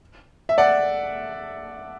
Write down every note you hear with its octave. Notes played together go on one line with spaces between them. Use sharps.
E5
D5 F#5